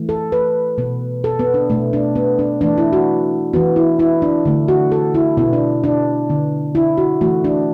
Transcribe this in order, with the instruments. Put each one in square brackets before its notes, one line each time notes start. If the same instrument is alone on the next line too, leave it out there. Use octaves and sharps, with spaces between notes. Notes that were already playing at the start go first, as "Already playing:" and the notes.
Already playing: [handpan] E3 A3
A4
B4
B2 B3
A4
B3
D4
B2 A3
D4
B3
D4
E3 A3 D4
E4
F#4
E3 B3 F#4
E4
E4
D4
D3 A3
F#4
A4
E4
B2 B3 E4
D4
D4
D3 B3
E4
F#4
E3 A3 F#4
D4